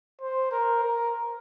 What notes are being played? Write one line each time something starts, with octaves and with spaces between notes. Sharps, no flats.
C5
A#4
A#4